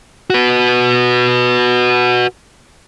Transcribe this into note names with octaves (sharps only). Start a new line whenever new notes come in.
F#4 B4